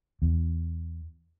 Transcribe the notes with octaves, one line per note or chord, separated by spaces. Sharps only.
E2